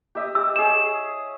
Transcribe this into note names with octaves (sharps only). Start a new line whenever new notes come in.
G4 D#5 E5
G4 E6
G#4 C#5 E7